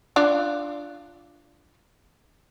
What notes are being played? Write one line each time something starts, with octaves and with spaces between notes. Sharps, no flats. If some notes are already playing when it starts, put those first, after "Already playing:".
D4 F4 D5